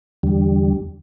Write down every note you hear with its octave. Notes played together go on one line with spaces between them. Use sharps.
E2 D3 G3